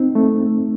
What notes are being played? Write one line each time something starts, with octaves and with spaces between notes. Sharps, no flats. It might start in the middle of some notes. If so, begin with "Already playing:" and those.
Already playing: C4 D#4
A3